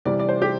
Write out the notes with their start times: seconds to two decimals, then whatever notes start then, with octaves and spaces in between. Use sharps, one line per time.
0.05 C3 E3 G3 D5
0.19 D5
0.29 C5
0.42 G4